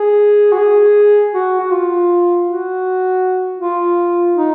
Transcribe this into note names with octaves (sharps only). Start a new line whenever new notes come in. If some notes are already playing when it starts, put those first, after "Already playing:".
Already playing: G#4
F#4
G#4
F#4
F#4
F4
F#4
F4
D#4